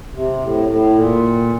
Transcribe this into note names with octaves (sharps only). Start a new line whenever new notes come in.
C3
A2
A2
A#2